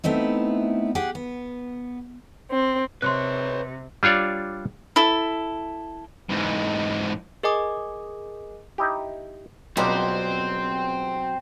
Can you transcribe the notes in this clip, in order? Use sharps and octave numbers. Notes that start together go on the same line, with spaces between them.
A3 B3 C4 D#4 E4
G4 G#4 F#5
B3
C4
C3 B4 C#5 C6 F#6
G3 D4 F4 C#5 D5
E4 A4
G#2 E3
G#4 A#4 D#5 G#5 D6 D#6
D#4 E4 G4
C#2 B2 F#3 G3 C4 G4 C5